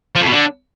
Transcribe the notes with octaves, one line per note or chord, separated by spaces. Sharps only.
F3
F2
B2
D3